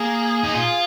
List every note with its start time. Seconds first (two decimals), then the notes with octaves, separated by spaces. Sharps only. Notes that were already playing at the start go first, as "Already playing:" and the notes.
Already playing: A#3 G#4
0.43 D#4
0.53 F4